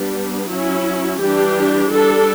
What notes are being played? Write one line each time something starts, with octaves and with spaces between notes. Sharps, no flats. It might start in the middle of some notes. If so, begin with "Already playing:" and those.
Already playing: G3 B3 D4
F#3 C#4 E4
E3 G3 D4 G4
G3 D4 A4